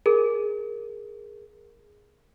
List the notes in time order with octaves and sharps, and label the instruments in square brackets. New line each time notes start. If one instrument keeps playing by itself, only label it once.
[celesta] G#4 A#4